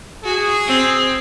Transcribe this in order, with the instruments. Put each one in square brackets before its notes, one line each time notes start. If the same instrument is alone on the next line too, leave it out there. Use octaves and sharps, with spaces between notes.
[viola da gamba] F#4 [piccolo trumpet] G#4
[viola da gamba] C4